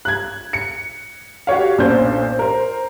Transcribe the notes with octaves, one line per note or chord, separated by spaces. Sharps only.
F#6 G#6
C#7
F#4 G4 C#5 F5
B1 A#2 C#4 D4 C5 G6
A#4 C5